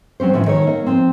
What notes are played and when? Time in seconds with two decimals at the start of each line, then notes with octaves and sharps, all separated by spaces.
0.20 F#3 C4 C#4 C5
0.33 A2 D3 E3 F3 C#4 E4
0.46 D#3 A4 C#5
0.67 A#3
0.86 F3 C4